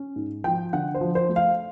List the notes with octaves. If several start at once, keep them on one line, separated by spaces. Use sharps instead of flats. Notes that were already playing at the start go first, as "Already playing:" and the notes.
Already playing: C#4
G#2
F3 G5
D3 F#5
C5
F3
C5
A3
F5